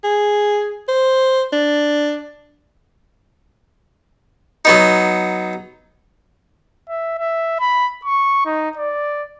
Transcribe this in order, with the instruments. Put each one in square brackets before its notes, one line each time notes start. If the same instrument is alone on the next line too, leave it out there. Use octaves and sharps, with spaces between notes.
[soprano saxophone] G#4
C5
D4
[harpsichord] F#3 B3 D#4
[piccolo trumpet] E5
E5
B5
C#6
D#4
D5